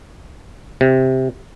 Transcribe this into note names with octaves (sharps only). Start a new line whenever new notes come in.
C3